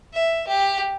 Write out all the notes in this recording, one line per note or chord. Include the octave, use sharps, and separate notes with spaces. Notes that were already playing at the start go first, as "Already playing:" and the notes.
E5
G4